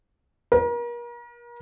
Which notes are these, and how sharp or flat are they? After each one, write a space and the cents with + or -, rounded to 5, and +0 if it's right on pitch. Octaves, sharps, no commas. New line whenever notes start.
A#4 +35